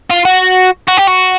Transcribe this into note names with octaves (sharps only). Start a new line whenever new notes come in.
F4
F#4
F#4
G4
F#4